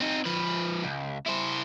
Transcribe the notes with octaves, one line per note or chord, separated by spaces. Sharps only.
C4 D#4
F3 B4
C#2
E4 C5